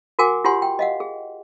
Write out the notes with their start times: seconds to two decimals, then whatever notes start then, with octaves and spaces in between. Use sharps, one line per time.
0.19 F#4 A#4 F#5 G#5 D6
0.44 F4 G4 C#5 F#5 G#5 C6
0.62 G5
0.79 D#5 F5 F#5
1.00 G#4